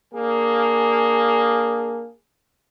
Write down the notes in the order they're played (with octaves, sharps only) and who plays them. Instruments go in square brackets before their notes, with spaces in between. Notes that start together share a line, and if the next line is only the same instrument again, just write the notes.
[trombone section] A#3 D4 G#4